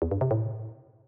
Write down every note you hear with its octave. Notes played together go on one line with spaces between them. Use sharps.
E2
G2
C3
A2